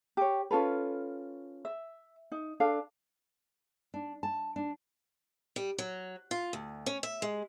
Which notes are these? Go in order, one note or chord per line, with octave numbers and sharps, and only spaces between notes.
G4 C#5
C#4 F4 A4 B4
E5
D#4
D4 A4 F5
D4
A5
D4
G3
F#3
F4
D2
C#4
E5
G#3